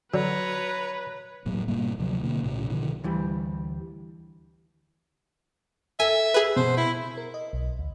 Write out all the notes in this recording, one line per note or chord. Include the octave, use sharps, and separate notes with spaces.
D3 F#3 B4 C#5 A#5
E1 A2 F#3 A#3
G#2 B2 G3 A#3
D2 C3 F3 F#3
B2 D3 A#3
B1 A2 C#3
B2 D3 D#3 F3
D2 E3 G3
A4 E5 G#5
G#4 B4
B2 C5
E4
A#4
D#5
B1
D2